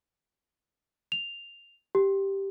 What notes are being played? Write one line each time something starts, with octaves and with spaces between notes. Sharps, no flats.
F7
G4